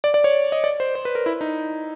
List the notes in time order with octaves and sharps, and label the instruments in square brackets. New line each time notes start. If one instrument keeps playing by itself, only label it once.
[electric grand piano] D5
D5
C#5
D#5
D5
C5
C5
B4
A#4
E4
D#4